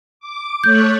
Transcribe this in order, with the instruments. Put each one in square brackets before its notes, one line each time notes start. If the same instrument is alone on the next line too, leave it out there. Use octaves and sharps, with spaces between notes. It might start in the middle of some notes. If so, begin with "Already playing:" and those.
[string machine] D6
[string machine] A3 C#5 F#6 [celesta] G6